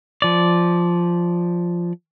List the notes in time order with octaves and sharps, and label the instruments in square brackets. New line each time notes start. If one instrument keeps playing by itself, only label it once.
[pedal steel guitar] F3 D5